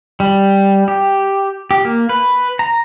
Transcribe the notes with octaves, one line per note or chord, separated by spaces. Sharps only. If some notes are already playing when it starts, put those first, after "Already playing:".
G3
G4
G4
A#3
B4
A#5